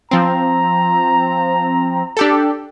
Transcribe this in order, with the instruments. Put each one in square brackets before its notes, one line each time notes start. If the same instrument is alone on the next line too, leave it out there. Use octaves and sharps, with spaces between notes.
[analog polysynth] F3 C4 [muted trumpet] A#5
[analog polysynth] D4 G4 A4